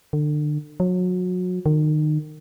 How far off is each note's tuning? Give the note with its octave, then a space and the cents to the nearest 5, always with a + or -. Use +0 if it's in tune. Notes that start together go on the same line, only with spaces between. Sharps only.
D3 +30
F#3 -30
D#3 -30